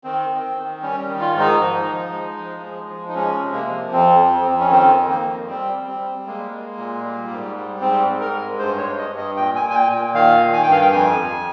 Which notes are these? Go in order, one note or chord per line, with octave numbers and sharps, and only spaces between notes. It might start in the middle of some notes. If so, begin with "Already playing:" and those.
D#3 C4
D#3
D#3
G3 C#4
D#3
F4
G#2
D#4
F3
F3
G#3
F3
G#3
F3
D#4
G#3 C#4
C3
A#3
F3
F2 C4
F2
F2
C#4
D#3 C4
D#3
A#3
F2
G3 C4
G3
C4
G3
G#3 A#3
G#3
A#2
G3
G#2
G3
G#2 C4
G#2
A#4
G#3
G2 C5
C#5
G2
D#5
G2
D#5
A#2 G5
G#5
A#2
G#5
G5
A#2
D#3 F5
D#3
G#5
G2 G5
F5
G5
F2 G#5
F2